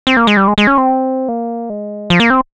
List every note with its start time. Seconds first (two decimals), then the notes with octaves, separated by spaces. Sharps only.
0.07 C4
0.17 A#3
0.27 G#3
0.37 G3
0.48 G#3
0.58 G#3
0.67 C#4
0.78 C4
1.28 A#3
1.70 G#3
2.10 F3
2.20 A#3
2.30 C4